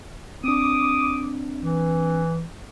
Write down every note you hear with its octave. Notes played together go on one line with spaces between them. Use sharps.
C4 D4 D6 D#6
E3